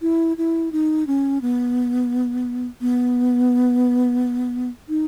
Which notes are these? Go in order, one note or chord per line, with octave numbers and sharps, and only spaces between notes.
E4
E4
D#4
C#4
B3
B3
D#4